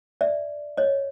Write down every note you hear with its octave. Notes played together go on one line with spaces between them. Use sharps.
D5 E5
C#5 D#5